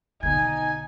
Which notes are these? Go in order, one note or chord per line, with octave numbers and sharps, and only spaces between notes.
B1 D3 D#4 G#5 G#6